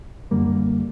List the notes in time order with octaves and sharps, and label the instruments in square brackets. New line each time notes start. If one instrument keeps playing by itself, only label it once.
[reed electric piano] F#2 D3 G3 A#3